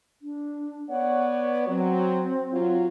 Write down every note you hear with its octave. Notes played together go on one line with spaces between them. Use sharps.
D4
B3 C#5 D5 F#5
F#3 C4
F#3 F4